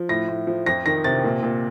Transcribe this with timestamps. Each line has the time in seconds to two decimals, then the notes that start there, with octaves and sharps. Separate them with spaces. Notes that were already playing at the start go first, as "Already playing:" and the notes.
Already playing: F3
0.09 A2 A#6
0.28 A2
0.47 F3
0.66 F2 A#6
0.86 D#3 A#6
1.04 C3 A6
1.24 A#2
1.43 A#2